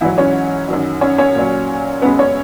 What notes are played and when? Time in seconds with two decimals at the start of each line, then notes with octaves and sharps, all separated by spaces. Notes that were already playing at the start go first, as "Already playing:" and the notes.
0.01 G#2 E3 E4
0.05 F#3
0.18 C#4 C#5
0.68 F#2 D#3 F#3
1.01 C#4 C#5
1.18 C#4 C#5
1.35 A#2 F#3
2.02 F#2 C#3 G#3 B3 B4
2.19 C#4 C#5